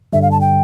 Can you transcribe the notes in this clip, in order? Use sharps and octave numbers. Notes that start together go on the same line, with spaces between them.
G2 D3 G3 E5
F5
A5
G5